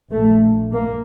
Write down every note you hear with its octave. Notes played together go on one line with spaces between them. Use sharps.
A#1 A#2 A3
A#3